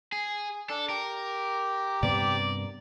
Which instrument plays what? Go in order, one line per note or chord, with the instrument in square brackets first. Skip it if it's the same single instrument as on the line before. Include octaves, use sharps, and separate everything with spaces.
[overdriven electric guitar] G#4
[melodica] D4 [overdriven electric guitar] A4
[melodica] G4 [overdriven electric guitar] A#4
[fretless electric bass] G2 C3 B3 [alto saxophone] D5